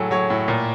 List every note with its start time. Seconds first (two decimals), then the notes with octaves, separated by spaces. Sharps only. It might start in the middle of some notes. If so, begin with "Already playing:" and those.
Already playing: A2 F#3 G#4 A4
0.11 F#3 C#5
0.30 A2
0.48 A#2